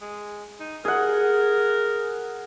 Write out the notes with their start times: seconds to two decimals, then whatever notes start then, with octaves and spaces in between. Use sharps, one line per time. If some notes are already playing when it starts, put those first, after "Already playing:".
0.02 G#3
0.60 D#4
0.85 G#4 A#4 F#5